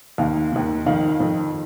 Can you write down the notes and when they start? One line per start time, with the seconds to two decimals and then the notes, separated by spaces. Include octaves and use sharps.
0.18 D#2 D#3 F5
0.52 D#2 D#3
0.86 F2 D#3 F5
1.20 F2 D#3